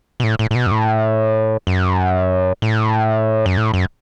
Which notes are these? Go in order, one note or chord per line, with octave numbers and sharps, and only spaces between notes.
B2
A2
A2
A2
B2
F#2
A2
F#2
A2
F#2
A2
F#2